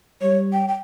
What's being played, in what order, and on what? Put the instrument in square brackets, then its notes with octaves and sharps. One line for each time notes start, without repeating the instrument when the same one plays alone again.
[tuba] G3 [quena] C#5
[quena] G5
G5